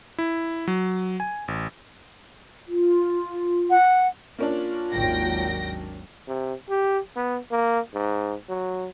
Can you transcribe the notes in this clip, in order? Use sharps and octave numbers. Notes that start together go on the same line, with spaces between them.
E4
F#3
G#5
A1
F4
F#5
A#3 C#4 D4 F4
G#1 D#2 F#3 G5 A#6
C3
G4
B3
A#3
G#2
F#3